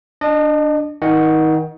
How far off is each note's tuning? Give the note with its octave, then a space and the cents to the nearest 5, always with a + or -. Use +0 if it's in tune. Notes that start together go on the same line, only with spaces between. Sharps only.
D4 +0 D#5 -30
D#3 +30 D#5 -10 F#5 +0